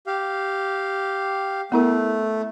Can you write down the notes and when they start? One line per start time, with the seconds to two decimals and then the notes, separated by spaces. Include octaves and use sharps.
0.07 G4 F5
1.72 A3 B3 E4 A#4